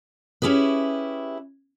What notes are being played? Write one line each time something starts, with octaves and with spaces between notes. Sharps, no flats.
C#4 E4 G4 G#4 B4